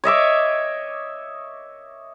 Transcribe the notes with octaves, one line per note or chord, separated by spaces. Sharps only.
C#5 D#5 E5 D6